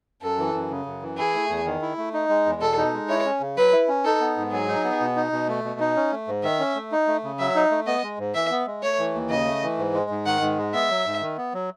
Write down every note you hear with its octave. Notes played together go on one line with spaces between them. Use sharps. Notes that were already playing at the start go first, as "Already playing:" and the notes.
F#2 A4
E3
F#2
C#3
F#2
E3
E4 G#4
A3
E2
D#3
E4
A3
D#4
G#3
E2
B2 A4
D#4
G#3
E4 C#5
C#4
C#3
F#3 B4
E4
C#4
D#4 A4
B3
G#2
F#3 G#4
D#4
B3
B2
D#4
B2
A3
B2
D#4
C#4
A3
G#2
D#3 E5
C#4
A3
D#4
A3
C#3
F#3 E5
D#4
A3
B3 D#5
G#3
G#2
E3 E5
B3
G#3
A3 C#5
E3
D#2
C#3 D#5
A3
E3
G#2
G#3
G#2
D#3 F#5
G#2
G#3
B3 E5
F#3
G#2
D#3
B3
F#3